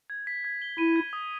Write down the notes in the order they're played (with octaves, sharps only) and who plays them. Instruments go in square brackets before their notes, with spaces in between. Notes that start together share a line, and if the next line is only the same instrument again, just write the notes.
[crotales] G#6
B6
G#6
G7
[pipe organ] E4 [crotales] D#7
[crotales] G#6
D#6